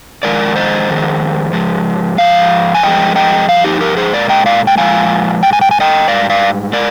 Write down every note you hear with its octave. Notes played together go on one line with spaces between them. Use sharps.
F2 D#3 G#3 A#4 D5
C5 D#5
F2 D#3 G#3
G#2 F3 G#3
G#2 F3 F5
G#5
G2 F3 G#3 D#5 G5
D#5 G5
G2 F3 F5
D#4 G4
G4 A#4
G#4 C5
A#2 F3 G#3 A#4 D5
D#5 G5
D5 F5
G5
A#2 F3 G#3 F5 G#5
G#2 G3 G5
G#5
G5
G#5
D#5 G5
G#2 G3 D5 F5
D5 F5
G#3 A#4 D5